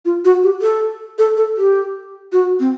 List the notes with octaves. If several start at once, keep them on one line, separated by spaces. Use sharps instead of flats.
F4
F#4
G4
A4
A4
A4
G4
F#4
C4